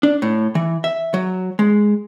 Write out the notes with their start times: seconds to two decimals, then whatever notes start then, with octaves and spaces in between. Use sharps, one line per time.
0.03 D4
0.22 A2
0.55 E3
0.84 E5
1.14 F#3
1.59 G#3